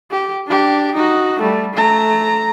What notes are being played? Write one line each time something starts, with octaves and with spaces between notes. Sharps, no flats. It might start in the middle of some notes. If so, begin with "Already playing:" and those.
G4
D4 G4
D#4 F#4
G3 A3
A3 A#5